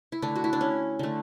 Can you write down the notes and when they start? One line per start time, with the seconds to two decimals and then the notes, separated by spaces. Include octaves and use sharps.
0.12 E4
0.22 D3 A3 D4
0.36 F#4
0.44 E4
0.53 D4
0.61 C#4
0.99 D3 A3